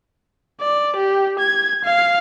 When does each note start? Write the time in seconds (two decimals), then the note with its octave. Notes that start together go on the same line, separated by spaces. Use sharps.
0.61 D5
0.96 G4
1.39 G#6
1.84 F5